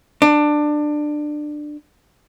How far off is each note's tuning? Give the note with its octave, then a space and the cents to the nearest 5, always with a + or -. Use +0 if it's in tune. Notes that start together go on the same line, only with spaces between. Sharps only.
D4 +20